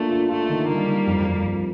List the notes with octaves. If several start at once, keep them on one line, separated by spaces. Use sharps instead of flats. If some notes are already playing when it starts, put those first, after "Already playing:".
Already playing: A3 A#3 D4 F4
F4
A3 F4
D#3
D#3 G3 A#3
D#3
F2
F2
F2